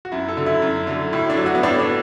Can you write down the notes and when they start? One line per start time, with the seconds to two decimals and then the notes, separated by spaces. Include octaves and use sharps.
0.05 F#4
0.12 F#2 E4
0.28 A4
0.37 D3 F#3
0.46 E4
0.62 F#2
0.87 D3 F#3
1.13 A2 E4
1.30 D4
1.37 F#3
1.46 F#4
1.55 B3
1.63 A2 D4
1.79 D4